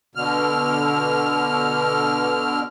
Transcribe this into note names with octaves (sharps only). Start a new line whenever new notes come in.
B2 D3 F6